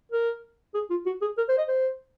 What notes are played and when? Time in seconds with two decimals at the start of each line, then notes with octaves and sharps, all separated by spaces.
0.12 A#4
0.74 G#4
0.90 F4
1.06 F#4
1.21 G#4
1.38 A#4
1.48 C5
1.58 D#5
1.68 C5